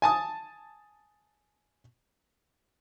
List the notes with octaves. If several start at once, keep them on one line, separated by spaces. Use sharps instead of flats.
G#5 A5 D#6